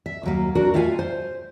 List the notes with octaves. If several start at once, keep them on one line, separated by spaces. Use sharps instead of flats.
E5
D#2 F#3 A#3
F2 D4 F#4 A#4
A3 F4 E5 F5 G5 G#5
C5